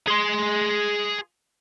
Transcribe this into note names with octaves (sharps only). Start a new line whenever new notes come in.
G#4 C6